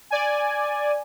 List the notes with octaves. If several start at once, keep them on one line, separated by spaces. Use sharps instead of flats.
D5 G#5